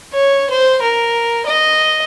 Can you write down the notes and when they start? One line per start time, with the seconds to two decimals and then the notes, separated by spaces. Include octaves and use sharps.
0.13 C#5
0.50 C5
0.82 A#4
1.46 D#5